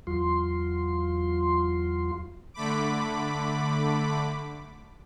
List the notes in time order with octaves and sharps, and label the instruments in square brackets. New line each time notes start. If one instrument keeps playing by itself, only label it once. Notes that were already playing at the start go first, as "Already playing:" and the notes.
[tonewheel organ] E2 F#3 F4 C6
[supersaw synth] D3 A3 B5 D6